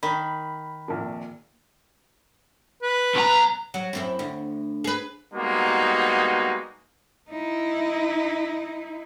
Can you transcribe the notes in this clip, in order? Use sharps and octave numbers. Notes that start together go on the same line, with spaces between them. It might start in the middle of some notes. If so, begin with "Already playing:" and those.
D#3 B5
A#1 F2 A#2
B4
B1 A#5
F#3
F#2 C4 E4
D2
G#4 B4
G3 G#3 A#3 B3 D#4 F#4
D#4 E4